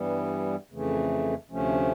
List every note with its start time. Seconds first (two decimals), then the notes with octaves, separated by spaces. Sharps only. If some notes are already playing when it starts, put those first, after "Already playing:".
Already playing: G2 E3 G3 B3
0.72 F2 C#3 E3 A3
1.50 D2 C3 F3 A3 C#4